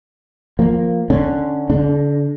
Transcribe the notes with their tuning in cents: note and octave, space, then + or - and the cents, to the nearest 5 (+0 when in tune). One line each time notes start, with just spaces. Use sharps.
F3 +0 A#3 +0
D3 +10 C#4 +0
D3 -40 D4 +5